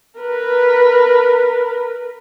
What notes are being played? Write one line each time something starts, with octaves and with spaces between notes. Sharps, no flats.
A#4 B4